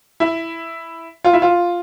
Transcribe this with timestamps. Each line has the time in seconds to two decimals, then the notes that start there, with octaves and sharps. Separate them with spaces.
0.20 E4
1.24 F4
1.33 E4
1.42 F4